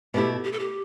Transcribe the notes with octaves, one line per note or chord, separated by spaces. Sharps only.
B2 A3 E4 G4
G4
A4
G4